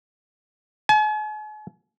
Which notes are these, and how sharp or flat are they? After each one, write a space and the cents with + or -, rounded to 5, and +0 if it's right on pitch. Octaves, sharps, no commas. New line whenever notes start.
G#5 +45